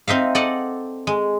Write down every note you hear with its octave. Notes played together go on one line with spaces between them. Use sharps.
C4 D#4 E5 F5
A4 D5 D#5 F#5
G#3